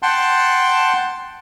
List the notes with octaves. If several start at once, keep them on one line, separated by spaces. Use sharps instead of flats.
F#5 G5 A5 C6